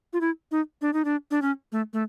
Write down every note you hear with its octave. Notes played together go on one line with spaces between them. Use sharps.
F4
E4
D#4
D4
D#4
D4
D4
C#4
A3
A3